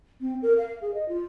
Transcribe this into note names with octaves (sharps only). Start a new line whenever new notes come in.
C4
A#4
F5
G#4
D#5
F4